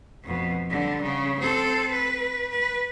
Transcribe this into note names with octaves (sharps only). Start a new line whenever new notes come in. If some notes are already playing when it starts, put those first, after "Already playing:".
F2 B2
D3 G3
C#3
C4 A4
B4
B4